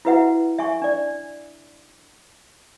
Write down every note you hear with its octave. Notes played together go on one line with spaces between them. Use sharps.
E4 F#4 B4 E5 F#5
E5 G#5 C#6
D4 D5